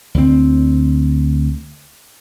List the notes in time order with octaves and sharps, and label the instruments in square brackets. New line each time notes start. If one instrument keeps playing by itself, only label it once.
[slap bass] D2 C4